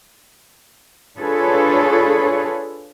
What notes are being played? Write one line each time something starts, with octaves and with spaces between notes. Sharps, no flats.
D4 F4 G#4 A4 B4 C#5